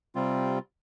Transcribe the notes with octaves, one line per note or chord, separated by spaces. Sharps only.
C3 G3 C4 F4